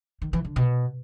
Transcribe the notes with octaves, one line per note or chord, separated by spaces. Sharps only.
D#3
E3
D3
B2